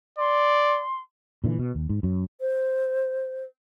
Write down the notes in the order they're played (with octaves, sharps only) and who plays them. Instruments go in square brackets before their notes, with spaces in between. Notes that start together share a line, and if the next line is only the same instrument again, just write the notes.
[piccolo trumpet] D5 [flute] C6
[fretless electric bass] A#2 D3 E3
B2
D#2
G#2
F#2 F#3
[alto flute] C5